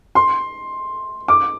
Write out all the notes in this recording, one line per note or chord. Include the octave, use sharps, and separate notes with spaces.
C6
D6